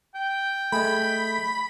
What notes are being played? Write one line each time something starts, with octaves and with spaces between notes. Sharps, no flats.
G5
A3 G#4 D#5 B5